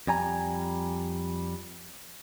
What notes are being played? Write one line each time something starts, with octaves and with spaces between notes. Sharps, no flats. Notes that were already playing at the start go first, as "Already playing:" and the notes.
F2 G3 G#5 A#5